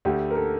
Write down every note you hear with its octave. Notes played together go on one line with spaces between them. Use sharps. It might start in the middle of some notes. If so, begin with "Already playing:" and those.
D2 D3 A3 G4
A#4
A4